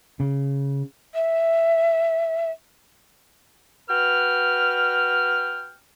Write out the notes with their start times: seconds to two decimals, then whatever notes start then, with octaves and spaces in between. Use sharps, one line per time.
0.20 C#3
1.15 E5
3.89 F#4 B4 G5 F6